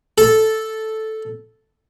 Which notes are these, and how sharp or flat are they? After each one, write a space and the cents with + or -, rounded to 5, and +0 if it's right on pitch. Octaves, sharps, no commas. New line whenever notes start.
A4 -5